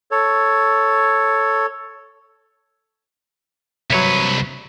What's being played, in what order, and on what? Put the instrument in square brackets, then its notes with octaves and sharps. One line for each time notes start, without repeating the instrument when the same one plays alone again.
[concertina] A4 C#5
[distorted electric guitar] C2 B4 [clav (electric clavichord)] F#3 C#5 E5